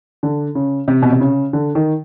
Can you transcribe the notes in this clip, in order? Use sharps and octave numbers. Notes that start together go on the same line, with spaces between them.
D3
C#3
C3
B2
C3
C#3
D3
D#3